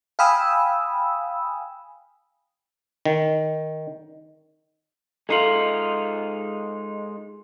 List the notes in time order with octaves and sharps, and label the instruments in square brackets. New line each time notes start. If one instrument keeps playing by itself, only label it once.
[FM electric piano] F5 G5 G#5 B5 D#6 E6
[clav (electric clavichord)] D#3
[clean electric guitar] G#3 D#4 F4 [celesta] A4 C7 F#7